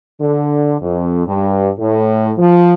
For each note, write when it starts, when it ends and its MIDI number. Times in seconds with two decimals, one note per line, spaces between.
0.20 0.76 50
0.81 1.25 41
1.27 1.70 43
1.79 2.32 45
2.38 2.73 53